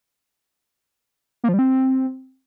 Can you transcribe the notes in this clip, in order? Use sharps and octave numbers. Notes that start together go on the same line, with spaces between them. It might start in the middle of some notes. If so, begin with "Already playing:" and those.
A#3
F3
G3
C4